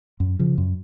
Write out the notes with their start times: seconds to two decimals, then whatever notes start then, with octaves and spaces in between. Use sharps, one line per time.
0.20 F#2
0.39 C#3 F3
0.58 F#2